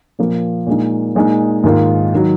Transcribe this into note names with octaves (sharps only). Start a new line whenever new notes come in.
A#2 F3 A#3 F4
A#2 G#3 D#4
A#2 G#3 D#4
G#2 D#3 A#3 F4
D#3 F#3